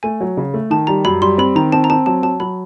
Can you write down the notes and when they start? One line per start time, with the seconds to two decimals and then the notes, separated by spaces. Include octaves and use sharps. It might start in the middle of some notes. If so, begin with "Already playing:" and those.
0.03 A3 G#5
0.21 F#3
0.37 C#3
0.54 A3
0.70 D#3 A5
0.87 G3 A#5
1.05 F#2 B5
1.22 G3 C6
1.38 C4 B5
1.55 D#3 A#5
1.72 C4 A5
1.84 A#5
1.90 C4 A5
2.06 F#3 A5
2.23 F#3 A5
2.40 F#3 B5